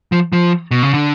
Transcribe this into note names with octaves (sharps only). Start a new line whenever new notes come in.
F3
F3
B2
C#3
D3